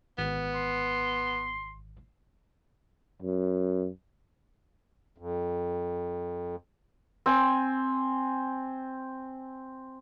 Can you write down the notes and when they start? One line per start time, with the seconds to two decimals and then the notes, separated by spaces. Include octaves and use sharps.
0.18 G#1 B3
0.54 C6
3.22 F#2
5.18 F2
7.26 C4 G#5